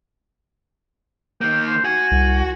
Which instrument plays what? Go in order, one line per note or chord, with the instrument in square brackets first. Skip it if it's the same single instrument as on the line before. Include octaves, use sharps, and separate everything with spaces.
[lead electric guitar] D#3 A#3 [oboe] G5
[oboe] C5
[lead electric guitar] F#4 [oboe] G#5
[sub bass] C2